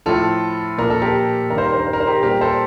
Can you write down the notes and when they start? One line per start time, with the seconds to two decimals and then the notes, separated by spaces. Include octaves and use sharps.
0.06 A2 F3 F4 A4
0.78 A#2 F3 A#4
0.90 A4
1.02 G4 A#4
1.50 G2 D#3 G3 A#4
1.58 C5
1.65 A#4
1.72 C5
1.80 A#4
1.87 C5
1.93 A#4
2.00 C5
2.07 G4 A#4
2.23 A#2 G3 G4 A#4
2.41 A4 C5